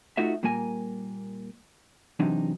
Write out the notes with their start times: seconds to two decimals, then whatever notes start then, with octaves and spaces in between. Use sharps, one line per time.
0.17 A3 D#4 F4 F#4 E5
0.43 A#2 G3 A#3 A#4 G#5
2.20 F#2 C3 E3 F#3 D4 D#4